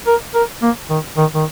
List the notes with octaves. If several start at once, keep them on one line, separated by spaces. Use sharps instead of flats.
A#4
A#4
A#3
D#3
D#3
D#3